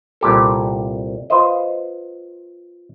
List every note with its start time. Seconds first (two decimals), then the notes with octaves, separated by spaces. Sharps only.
0.21 C2 A#2 G4 A4
1.30 F4 B4 C5 D#5